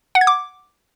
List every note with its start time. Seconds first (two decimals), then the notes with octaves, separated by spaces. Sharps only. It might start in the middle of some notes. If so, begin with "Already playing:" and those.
0.15 F#5
0.21 G#6
0.27 D6